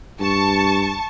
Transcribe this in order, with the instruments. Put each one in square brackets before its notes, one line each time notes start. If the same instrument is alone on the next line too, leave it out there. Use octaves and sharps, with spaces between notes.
[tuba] G2 [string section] A5 C#6